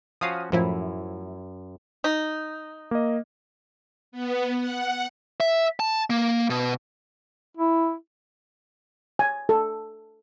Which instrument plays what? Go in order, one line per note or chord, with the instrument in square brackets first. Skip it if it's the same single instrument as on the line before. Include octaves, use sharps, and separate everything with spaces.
[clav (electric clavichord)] F3 C#4 F#4 [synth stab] F5 D#6
[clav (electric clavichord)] F#2 [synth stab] A2 F3 E4
[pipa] D#4
[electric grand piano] A#3 D#5
[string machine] B3
F#5
[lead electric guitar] E5
A5
A#3
B2
[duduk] E4
[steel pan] G#5
A4